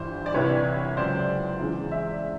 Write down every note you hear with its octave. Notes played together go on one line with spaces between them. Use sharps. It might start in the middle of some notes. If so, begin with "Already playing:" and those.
Already playing: G1 G2 E3 C5
D5
C2 C3 E3 G3 B4 C#5
C#2 C#3 F#3 C5 D5
E2 C#3 E3 G#3
D5 E5